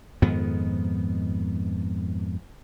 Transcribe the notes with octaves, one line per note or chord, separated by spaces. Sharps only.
F2 G#2 D#3 B3